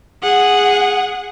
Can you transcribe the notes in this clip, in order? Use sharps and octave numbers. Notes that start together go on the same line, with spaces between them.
G#4 F#5